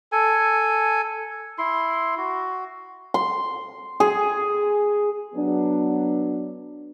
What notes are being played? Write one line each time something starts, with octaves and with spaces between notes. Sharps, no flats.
A4 G#5
E4 C6
F#4
C6
G#4
F#3 B3 D4